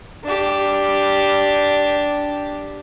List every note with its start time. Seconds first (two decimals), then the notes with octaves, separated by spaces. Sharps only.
0.24 D4 G4